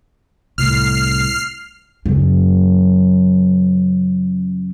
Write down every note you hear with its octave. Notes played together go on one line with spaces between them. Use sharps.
C2 A2 F6 C7
F#2 C#3